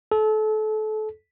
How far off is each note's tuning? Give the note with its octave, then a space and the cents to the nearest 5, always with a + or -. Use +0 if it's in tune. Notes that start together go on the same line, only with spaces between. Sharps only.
A4 -30